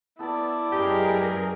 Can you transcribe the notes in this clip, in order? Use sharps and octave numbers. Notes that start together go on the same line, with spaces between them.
B3 E4 A4 D5
F#2 G#3 G4 G#4 A#4 B4 D#6